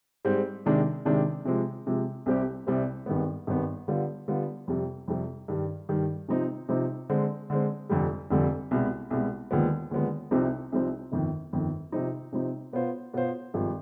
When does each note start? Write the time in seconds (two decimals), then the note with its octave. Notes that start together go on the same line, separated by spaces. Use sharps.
0.25 G#2 G3 C4
0.66 C3 D#3 G#3 D4
1.05 C3 D#3 G#3 D4
1.45 C3 F3 G#3
1.87 C3 F3 G#3
2.26 C2 C3 G3 C4 G4
2.67 C2 C3 G3 C4 G4
3.06 G#1 G2 D#3 B3
3.47 G#1 G2 D#3 B3
3.88 D3 G3 B3 F4
4.28 D3 G3 B3 F4
4.68 F2 C3 G3
5.08 F2 C3 G3
5.48 G2 D#3 G3
5.89 G2 D#3 G3
6.28 C3 F3 C4 D#4
6.69 C3 F3 C4 D#4
7.09 D3 G#3 C4
7.50 D3 G#3 C4
7.89 F1 F2 D3 G3
8.30 F1 F2 D3 G3
8.71 C2 B2 G#3
9.10 C2 B2 G#3
9.51 D#2 D3 F3 G#3 B3
9.91 D#2 D3 F3 G#3 B3
10.31 C2 C3 F3 C4 D#4
10.72 C2 C3 F3 C4 D#4
11.12 G1 F2 D#3
11.53 G1 F2 D#3
11.92 C3 F3 C4 D#4
12.32 C3 F3 C4 D#4
12.73 B2 B3 F4 C5
13.14 B2 B3 F4 C5
13.54 G#1 G2 F3